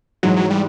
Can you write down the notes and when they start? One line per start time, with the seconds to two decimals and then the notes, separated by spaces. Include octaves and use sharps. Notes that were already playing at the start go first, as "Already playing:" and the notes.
0.23 G#2 E3 F#3 G#3
0.36 F#3
0.50 G3